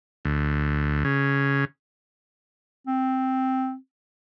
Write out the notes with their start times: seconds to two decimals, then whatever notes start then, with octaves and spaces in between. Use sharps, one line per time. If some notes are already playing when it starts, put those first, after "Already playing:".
0.25 D2
1.05 C#3
2.87 C4